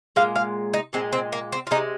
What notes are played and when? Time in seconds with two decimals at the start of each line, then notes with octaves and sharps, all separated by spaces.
0.16 A#2 G#3 F5
0.35 F5
0.73 D#4
0.93 A#2 G#3 C4
1.12 C4
1.32 A#3
1.52 C4
1.67 F4
1.71 G#3 D#4
1.75 C3